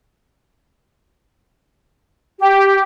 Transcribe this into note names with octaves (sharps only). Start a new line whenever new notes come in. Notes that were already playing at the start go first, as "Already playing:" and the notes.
G4